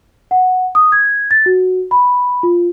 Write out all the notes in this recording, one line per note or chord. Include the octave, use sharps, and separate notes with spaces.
F#5
D#6
G#6
A6
F#4
B5
F4